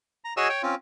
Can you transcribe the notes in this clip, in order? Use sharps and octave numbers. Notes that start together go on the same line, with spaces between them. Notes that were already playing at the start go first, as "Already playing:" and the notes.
A#5
F#4 G#4 C#5 D#5 G#5 E6
C#5 G5
C4 C#4 F4